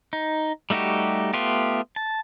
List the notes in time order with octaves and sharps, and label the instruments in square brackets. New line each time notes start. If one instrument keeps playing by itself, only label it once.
[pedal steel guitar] D#4
G3 A3 D#4 F#4 G4
A3 B3 F4 G4
A5